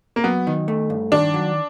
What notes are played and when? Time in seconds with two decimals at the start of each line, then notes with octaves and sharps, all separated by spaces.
0.16 A#3
0.24 F#3 B3
0.47 D#3
0.68 A3
0.90 G2
1.12 D#3 D4
1.34 F#3